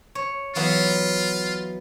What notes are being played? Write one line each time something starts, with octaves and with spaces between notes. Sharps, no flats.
C#5
E3 F#3 B3 F4